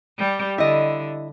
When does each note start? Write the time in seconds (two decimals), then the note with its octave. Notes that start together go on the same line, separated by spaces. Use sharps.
0.18 G3 G4
0.58 D3 E4 D#5